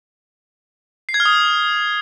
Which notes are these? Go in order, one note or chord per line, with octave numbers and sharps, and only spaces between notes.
C7
G#6
F6
D#6